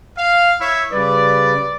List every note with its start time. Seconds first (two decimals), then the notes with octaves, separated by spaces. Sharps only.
0.18 F5
0.60 E4 C#5 E5
0.92 C#3 G3 B4 D5